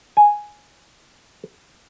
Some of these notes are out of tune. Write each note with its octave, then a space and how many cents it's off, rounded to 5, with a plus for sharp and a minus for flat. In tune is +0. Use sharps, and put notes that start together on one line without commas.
G#5 +0